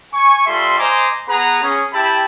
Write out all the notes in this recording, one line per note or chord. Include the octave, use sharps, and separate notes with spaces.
G#5 C#6
G3 F4 A4 E5 C6
C5 D#5 G#5 A#5 C6 D6
B3 G#4 B4 F#5 A#5
C#4 G#4
E4 G4 E5 G5 A5 B5